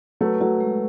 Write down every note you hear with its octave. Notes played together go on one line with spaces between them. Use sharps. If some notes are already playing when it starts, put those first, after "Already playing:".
F#3 A3 B4
F#3 A3 F#4
G#3